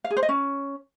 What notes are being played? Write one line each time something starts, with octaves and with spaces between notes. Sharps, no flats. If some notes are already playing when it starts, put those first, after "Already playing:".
F5
G#4
C5
D#5
C#4